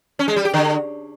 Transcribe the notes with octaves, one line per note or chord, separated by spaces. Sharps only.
C#4
G#3
G3
G4
D3